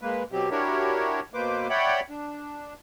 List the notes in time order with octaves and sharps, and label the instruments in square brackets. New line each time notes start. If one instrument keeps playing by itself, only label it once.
[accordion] G#3 A#3 B4
B2 F#3 C4 G4
D4 E4 F#4 G4 A#4 C#5
B2 A#3 B4 C5 D6
C#5 D5 E5 F#5 G5 B5
D4